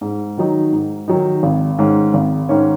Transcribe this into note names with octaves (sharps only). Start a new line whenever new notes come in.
G#2
D#3 F#3 D#4
G#2
D#3 F#3 D#4
G#1
G#2 D#3 G#3 C#4
G#1
G#2 D#3 G#3 C#4